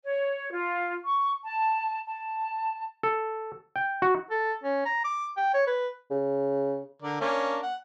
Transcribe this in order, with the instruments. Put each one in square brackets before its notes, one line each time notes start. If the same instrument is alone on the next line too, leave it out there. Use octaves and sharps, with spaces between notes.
[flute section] C#5
F4
C#6
A5
A5
[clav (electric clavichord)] A4
G5
F#4
[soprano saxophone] A4
C#4
A#5
D6
G5
C#5
B4
[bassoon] C#3
[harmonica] D3 A#4 D5
A#3 C#4 D4
F#5